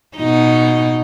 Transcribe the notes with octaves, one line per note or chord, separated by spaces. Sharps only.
B2 D#4